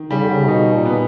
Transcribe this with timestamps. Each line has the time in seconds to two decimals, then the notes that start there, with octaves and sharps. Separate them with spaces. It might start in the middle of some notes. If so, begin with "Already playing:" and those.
Already playing: D#3
0.10 C#3 G3
0.21 D3
0.31 C#3
0.48 B2 D#4
0.73 A#2
0.86 B3